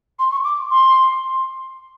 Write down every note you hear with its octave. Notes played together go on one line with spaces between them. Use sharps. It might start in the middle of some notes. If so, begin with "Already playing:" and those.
C6
C#6
D6
C6